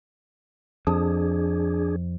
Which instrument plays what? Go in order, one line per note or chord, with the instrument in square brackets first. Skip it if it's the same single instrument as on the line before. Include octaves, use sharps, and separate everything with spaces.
[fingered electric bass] F2 [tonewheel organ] D4 G#4